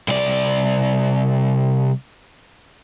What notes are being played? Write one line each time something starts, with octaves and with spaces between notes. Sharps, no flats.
C2 D5